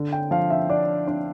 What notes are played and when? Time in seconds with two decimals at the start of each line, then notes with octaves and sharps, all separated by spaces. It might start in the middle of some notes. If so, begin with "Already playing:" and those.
Already playing: D3
0.13 G5
0.31 F3 F5
0.50 E5
0.70 D4 D5
1.07 D4 D5